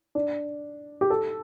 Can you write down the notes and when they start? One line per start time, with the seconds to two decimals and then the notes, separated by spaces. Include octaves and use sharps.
0.15 D4
1.01 G4
1.10 A4